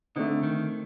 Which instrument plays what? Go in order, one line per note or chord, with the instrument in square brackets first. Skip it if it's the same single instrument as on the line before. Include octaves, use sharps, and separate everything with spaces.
[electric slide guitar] D3 [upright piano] A3 C4 D#4
[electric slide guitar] D#3